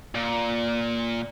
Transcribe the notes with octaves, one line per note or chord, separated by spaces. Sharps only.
A#2